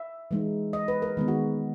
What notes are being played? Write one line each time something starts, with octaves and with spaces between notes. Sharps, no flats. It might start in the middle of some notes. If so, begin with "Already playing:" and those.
Already playing: E5
E3 G#3 D#4
D#5
B4
A#4
D#3 G#3 B3
F#4